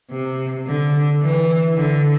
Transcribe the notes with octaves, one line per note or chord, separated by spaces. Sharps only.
C3
D3
E3
D3